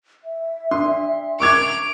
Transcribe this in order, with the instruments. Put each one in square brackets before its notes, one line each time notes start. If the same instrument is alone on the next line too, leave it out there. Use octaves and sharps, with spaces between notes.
[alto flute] E5
[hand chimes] D4 [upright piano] C6
[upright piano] C#6 D6 G#6 [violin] D7 F7